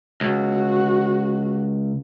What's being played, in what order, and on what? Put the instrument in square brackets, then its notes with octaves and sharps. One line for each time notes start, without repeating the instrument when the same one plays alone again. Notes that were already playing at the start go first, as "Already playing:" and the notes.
[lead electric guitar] C#2 [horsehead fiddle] F#4